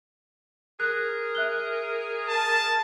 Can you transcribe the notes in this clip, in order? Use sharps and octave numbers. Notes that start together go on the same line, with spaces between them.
G#4 A#4 F#6
E5 F#6 G7
A5